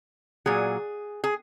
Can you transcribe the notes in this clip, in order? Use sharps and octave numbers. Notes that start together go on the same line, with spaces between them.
A#2 F#3 G#4
G#4